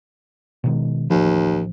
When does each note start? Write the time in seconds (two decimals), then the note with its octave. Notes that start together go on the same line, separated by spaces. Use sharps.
0.64 B2 D#3 G#3
1.10 A1 D#2 F3